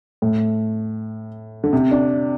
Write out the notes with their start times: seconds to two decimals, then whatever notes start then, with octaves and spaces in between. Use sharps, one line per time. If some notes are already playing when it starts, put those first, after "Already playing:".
0.22 A2
1.64 D3
1.73 C3
1.91 D4